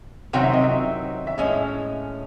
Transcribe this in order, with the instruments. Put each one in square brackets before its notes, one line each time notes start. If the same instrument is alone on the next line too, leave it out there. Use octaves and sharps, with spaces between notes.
[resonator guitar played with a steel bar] C3 D#3 F#3 C4 [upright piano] F#5
[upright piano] E5
D#5
E5
E5
[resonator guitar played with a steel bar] A2 G#3 C#4 [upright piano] D#5